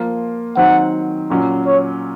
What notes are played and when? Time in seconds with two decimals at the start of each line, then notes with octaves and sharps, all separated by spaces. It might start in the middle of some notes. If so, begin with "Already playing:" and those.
Already playing: F3 A#3 F4
0.56 D#3 F#3 C4 F#5
1.30 A#2 F#3 C#4
1.66 C#5